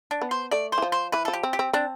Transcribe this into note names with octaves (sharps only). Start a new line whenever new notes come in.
D4
B3
C5
A3 D5
C5
E3
F3
C5
E3 B4
A4
F3
G4
C4
G4
C4
C4 D4